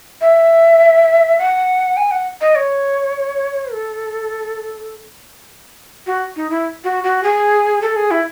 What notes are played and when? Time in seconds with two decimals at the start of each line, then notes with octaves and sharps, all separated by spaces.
0.21 E5
1.39 F#5
1.97 G#5
2.11 F#5
2.41 D#5
2.55 C#5
3.72 A4
6.06 F#4
6.36 D#4
6.50 E4
6.84 F#4
7.04 F#4
7.23 G#4
7.82 A4
7.96 G#4
8.11 E4